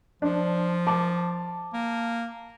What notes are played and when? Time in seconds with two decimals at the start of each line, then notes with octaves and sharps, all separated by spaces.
0.22 F3 D4
0.87 A5 D6
1.73 A#3